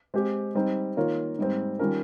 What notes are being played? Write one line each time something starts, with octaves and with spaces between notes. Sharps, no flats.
G#3 C4 G4 C5
G3 C4 D#4
D#3 A#3 F4 A#4 C#5
G#2 G3 C4
D#3 G3 C#4 F4 A#4